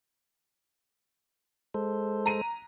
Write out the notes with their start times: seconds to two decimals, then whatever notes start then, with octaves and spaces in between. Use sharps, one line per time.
1.74 G#3 A4 C5
2.26 A#5 D#7